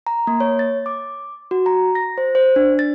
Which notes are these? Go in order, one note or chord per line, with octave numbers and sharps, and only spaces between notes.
A#5
A#3
C#5
A6
D6
F#4
A#5
A#6
C5
C5
D4
A6